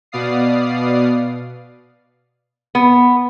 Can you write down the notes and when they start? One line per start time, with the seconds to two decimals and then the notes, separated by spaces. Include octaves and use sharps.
0.12 B2 B3 D5 F5 D#6 C7
2.75 B3